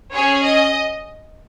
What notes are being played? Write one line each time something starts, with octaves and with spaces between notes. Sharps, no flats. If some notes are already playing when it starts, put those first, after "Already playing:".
C#4 G#4 C#5
D#5